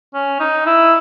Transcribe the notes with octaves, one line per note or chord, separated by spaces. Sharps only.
C#4
D#4
E4